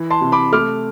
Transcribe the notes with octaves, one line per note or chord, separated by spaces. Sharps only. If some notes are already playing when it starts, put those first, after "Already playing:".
Already playing: E3
A5 C6
C3
B5 D6
A3 D6 F6